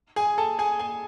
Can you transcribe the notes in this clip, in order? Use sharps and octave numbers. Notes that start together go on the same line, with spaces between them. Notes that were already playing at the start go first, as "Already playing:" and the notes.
G#4 G#5
A4 A5
G#4 G#5
G#4 G#5